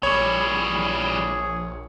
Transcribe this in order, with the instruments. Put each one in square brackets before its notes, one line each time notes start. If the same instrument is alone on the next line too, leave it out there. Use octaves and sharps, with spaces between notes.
[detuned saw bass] A#1 [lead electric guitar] E3 G3 [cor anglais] G#4 [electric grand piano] C#5